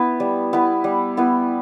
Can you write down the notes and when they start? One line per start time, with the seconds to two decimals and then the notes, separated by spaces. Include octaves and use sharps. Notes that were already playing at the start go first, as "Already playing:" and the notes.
Already playing: B3 E4 B4
0.20 G3
0.53 B3 E4 B4
0.84 G3
1.17 B3 E4 B4